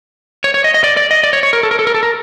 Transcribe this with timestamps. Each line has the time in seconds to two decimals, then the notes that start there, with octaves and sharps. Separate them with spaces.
0.44 C#5
0.54 C#5
0.64 D#5
0.74 D#5
0.84 D5
0.97 D5
1.11 D#5
1.24 D5
1.33 C#5
1.43 C#5
1.53 A#4
1.63 A4
1.71 A#4
1.79 A4
1.87 A#4
1.94 A4
2.03 A#4